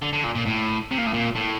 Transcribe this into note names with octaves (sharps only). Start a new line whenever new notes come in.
D3
D3
A#2
A#2
A2
C3
A#2
A2
A#2
A2